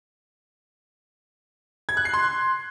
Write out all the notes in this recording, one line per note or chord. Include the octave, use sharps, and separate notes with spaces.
G#6
F#6
C7
C6